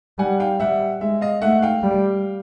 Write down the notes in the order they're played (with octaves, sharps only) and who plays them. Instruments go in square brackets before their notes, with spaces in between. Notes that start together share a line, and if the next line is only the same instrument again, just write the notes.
[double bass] G3 [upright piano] F#5 G#5
[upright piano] F5 G5
[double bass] G3 [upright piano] E5 F#5
[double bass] G#3 [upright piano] E5
[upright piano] D#5 F5
[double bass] A3 [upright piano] E5 F#5
[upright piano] F5 G5
[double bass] G3